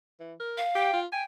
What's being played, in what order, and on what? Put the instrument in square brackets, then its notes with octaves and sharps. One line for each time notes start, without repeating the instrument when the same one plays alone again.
[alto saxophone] E3
A#4
[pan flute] F5
[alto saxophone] G4 [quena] G5
[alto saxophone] F4
[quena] G5 [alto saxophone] G#5